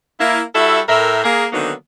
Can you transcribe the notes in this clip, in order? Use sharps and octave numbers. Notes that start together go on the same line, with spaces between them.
A#3 E4
G3 E4 F#4 A4 E5
A2 A#4 E5
A#3 G#4
D3 D#3 F#3 A#3 B3 D#4